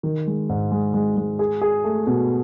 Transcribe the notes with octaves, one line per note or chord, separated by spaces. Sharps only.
D#3
G#3
G#2
G#3
G#3
G#3
G#4
G#4
A3
B2